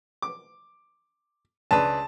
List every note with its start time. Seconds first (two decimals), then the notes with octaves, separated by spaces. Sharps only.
0.22 D6
1.71 C#2 D4 B4 A5